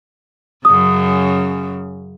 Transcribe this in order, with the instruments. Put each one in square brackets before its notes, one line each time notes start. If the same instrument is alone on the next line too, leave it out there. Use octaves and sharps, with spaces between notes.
[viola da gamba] F#2 C#3 [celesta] D#6